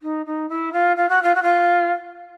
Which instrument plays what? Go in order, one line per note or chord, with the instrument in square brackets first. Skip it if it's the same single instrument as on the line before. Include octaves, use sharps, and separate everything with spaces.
[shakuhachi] D#4
D#4
E4
F4
F4
F#4
F4
F#4
F4